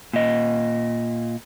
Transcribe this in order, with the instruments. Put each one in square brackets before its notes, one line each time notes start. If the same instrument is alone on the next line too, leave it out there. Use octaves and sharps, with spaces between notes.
[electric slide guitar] A#2 D#5